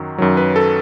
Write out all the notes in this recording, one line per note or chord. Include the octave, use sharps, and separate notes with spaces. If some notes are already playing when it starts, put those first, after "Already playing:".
Already playing: F#2 D#3 F#3
F#2 D#3 F#3
B4
A4